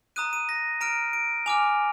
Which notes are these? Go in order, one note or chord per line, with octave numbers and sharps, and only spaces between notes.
A#5 D#6 F#6 D#7
D#7
A#6
A#5 F6 D7
D7
G#5 D6 F6 F7